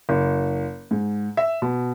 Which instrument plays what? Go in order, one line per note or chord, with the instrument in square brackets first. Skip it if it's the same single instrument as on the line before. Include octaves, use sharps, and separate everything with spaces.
[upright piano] F#1
G#2
E5
B2